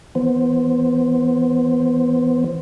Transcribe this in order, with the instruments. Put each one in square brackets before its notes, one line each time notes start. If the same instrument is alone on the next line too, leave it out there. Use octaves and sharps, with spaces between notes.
[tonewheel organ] E3 B3 C5